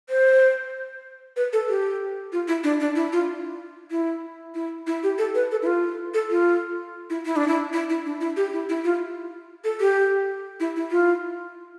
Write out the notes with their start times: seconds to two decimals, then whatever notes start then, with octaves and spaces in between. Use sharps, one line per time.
0.10 C5
1.36 B4
1.53 A4
1.69 G4
2.32 F4
2.48 E4
2.64 D4
2.80 D4
2.96 E4
3.13 F4
3.91 E4
4.55 E4
4.87 E4
5.03 G4
5.18 A4
5.35 B4
5.51 A4
5.62 E4
5.66 F4
6.14 A4
6.30 F4
7.10 E4
7.26 E4
7.36 D4
7.48 E4
7.73 E4
7.90 E4
8.06 D4
8.21 E4
8.37 G4
8.53 E4
8.69 E4
8.84 F4
9.64 A4
9.80 G4
10.60 E4
10.76 E4
10.91 F4